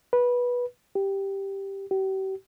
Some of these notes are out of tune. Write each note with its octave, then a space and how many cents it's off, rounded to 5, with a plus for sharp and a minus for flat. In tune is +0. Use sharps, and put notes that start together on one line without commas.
B4 -15
G4 +0
G4 -40